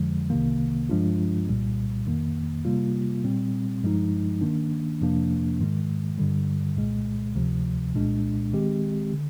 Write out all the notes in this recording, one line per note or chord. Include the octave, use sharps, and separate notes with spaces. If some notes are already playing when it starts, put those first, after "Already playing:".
Already playing: F2 D3 F3 G#3
C2 C3 D#3 A#3
G2 F3 G#3 D4 F4
C2 A#2 G3
F2 D#3 A#3
C3 G3 A#3 F4
A#2 G3 C4
G2 F3 G#3 D#4
D#3 A#3 D4
F2 C3 F3 A#3 D4
G#2 D#3 G#3
G2 D3 G3
C2 A#2 G#3
D2 C3 F3
C2 A#2 G#3 D4
D#3 G#3 C4 G4
D3